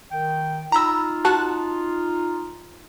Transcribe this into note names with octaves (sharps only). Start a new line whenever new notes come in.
D#3 G5
D#4 F4 A#5 B5 E6
F#4 A5 F#6